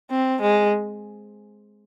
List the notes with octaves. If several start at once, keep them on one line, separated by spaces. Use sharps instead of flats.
C4
G#3